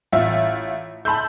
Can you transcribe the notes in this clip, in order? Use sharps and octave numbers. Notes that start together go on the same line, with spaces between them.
A1 F4 E5
A5 B5 C6 E6 G6